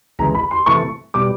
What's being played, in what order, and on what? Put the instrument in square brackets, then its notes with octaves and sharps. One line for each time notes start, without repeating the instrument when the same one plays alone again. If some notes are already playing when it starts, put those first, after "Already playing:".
[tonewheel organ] D2 C#3 E3 G#3 [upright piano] A#5
[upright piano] B5
C6
[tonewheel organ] C3 E3 A3 [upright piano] C#6
[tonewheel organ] B2 G3 [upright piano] D6